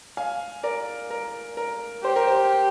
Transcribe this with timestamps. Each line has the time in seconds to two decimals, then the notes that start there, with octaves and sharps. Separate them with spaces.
0.17 F5 G#5
0.63 A#4 D5
1.10 A#4
1.57 A#4
2.04 G4 C5
2.16 A#4
2.27 C5